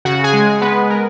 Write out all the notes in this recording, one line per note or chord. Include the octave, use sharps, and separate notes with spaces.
C#3 F#4 F#5
G#4 G#5
G#3
G#3 B3 B4
A#4